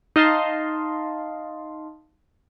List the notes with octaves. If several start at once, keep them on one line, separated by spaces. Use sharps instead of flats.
D#4 D#5 F5 A5 C6